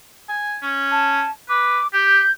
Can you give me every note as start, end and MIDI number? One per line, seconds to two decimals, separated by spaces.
0.29 0.57 80
0.62 1.24 61
0.92 1.31 81
1.49 1.79 71
1.49 1.88 86
1.94 2.23 67
1.94 2.31 91